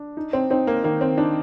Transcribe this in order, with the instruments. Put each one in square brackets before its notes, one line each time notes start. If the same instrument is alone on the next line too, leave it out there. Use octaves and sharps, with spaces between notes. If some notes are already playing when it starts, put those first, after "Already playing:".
Already playing: [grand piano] D4
D#4
[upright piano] C4
[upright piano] C4 [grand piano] D#4
[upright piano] A#3
[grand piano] D#3 [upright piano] A#3
[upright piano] C4
[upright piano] D4 [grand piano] D#4